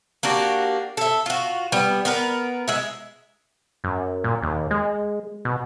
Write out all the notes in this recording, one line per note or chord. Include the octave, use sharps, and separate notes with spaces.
A#3 D4 F#4 G4
A4 E5
F4 F#4
G3 B3
B3 A#4 B4
G#3 E5
F#2
A#2
D#2
G#3
B2